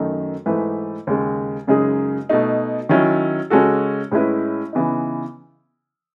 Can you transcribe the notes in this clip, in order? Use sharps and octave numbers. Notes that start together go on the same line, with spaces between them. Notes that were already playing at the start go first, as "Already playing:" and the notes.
Already playing: F#2 D#3 A3 D#4
G#2 E3 A3 E4 B4
D#2 C#3 G#3
F#2 C#3 G#3 D#4 G#4
B2 A3 D#4
D#3 F#3 C#4 E4
C#3 G#3 C#4 F#4 A4
A2 G#3 C#4 E4 B4
C#3 E3 B3 D#4